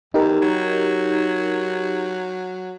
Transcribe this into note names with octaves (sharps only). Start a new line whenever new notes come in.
E2 D#4 G4 A#4
F#3